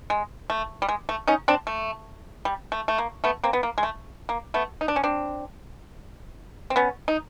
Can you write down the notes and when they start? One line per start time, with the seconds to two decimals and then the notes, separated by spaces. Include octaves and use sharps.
0.10 G#3
0.50 A3
0.82 G3
0.89 G#3
1.09 A3
1.28 C#4 D#4
1.48 C4 D4
1.67 A3
2.45 G3
2.72 A3
2.88 A3
2.98 A#3
3.24 A3 B3
3.44 A#3 C4
3.53 B3
3.63 A#3
3.78 G#3
3.83 A3
4.29 A#3
4.54 A3 B3
4.81 D#4
4.88 D4
4.96 C#4
5.03 C4 D4
6.70 C4
6.76 B3 C#4
7.08 D#4